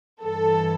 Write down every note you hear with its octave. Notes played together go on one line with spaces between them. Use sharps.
G2 E3 A4